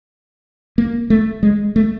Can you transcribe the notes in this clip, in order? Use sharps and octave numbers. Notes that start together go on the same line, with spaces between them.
A#3
A3
G#3
A3